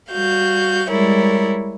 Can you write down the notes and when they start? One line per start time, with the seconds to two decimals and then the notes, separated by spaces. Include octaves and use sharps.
0.12 G3 F#4 F5 G6
0.90 G3 G#3 E4 A#4 C#5